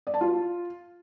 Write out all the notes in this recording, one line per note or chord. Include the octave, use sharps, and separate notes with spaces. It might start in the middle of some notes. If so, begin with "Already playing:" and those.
D5
A5
F4